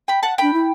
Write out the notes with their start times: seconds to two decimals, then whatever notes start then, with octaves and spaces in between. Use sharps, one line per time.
0.08 G5 B5
0.23 F#5 A5
0.38 D4 G5 B5
0.54 E4